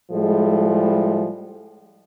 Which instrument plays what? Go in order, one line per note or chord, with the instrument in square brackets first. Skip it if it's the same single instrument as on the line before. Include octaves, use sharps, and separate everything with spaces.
[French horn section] A2 F3 G3 G#3